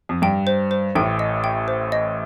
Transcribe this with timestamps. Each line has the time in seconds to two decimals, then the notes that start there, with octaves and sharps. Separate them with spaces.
0.09 F2
0.22 G2 G5
0.47 C5
0.71 C5
0.95 A1 A2 G5
1.19 D#5
1.44 G5
1.68 C5
1.92 D#5